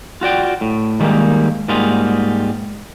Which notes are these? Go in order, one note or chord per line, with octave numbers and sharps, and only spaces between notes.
F4 F#4 D5 G5
A2
D#3 G3 G#3 A#3
G#2 G3 A#3 F4 F#4 G#4